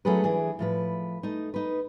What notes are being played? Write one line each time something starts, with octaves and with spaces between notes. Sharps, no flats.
F#3 A3 C#4 G#4 A4 B4
E3 D4 G#4
A2 F3 B4
A3 D#4
D#4 B4